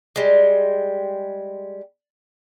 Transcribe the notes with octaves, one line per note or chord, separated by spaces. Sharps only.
G3 G#3